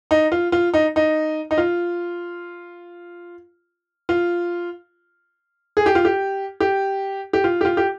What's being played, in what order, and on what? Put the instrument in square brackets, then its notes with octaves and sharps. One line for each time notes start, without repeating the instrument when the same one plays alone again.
[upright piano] D#4
F4
F4
D#4
D#4
D#4
F4
F4
G#4
G4
F4
G4
G4
G4
F4
G4
F4
G4